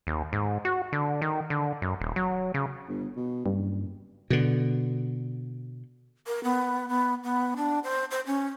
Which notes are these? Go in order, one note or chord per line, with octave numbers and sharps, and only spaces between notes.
D#2
G#2
F#4
D3
D#3
D3
F#2
D#1
F#3
C#3
G1
B2
F#1 G2
B2 D3
A#4
B3
B3
B3
D4
C5
C5
C#4